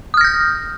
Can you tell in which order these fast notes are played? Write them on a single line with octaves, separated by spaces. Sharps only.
D#6 F6 A#6 G6